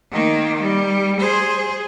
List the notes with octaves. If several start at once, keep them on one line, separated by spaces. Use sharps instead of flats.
D#3 A#3
G3
G#4 C5